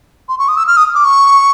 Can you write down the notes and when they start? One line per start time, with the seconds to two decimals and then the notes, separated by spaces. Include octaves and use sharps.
0.29 C6
0.39 C#6
0.48 D#6
0.57 E6
0.67 F6
0.77 D#6
0.95 D6
1.05 C#6